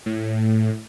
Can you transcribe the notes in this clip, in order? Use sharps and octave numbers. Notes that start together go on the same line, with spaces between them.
A2